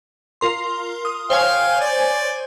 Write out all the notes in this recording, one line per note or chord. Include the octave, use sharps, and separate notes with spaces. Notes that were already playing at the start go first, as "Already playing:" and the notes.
F4 A#4 C6
D#6
C5 C#5 F5 G5 G#5 F6
D5